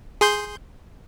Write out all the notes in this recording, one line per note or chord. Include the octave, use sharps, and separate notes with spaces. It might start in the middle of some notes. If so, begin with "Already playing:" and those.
G#4 C6 G6